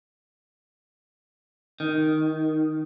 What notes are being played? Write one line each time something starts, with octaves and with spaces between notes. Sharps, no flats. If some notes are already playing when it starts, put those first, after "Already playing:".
D#3